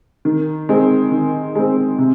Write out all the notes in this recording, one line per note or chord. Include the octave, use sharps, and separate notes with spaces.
D#3
G#3 C4
D#3
G#3 C4
C3